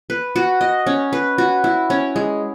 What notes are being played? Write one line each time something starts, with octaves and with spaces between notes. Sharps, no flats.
B4
F#4
D#5
C#4
B4
F#4
E4
C#4
G#3